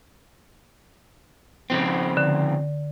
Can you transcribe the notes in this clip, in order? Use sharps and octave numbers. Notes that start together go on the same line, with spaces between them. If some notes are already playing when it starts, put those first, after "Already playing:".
C#3 F3 C4
D3